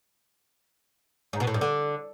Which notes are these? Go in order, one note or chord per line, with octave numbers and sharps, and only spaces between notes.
G#2
B2
A2
G2
D3